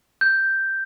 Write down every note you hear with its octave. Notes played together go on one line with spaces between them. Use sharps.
G6